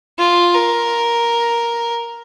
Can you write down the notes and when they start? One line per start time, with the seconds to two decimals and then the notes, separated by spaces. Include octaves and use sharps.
0.19 F4
0.54 A#4